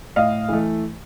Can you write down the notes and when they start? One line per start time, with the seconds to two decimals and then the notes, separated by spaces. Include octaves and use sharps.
0.16 A2 D#5 F5
0.49 E3 A3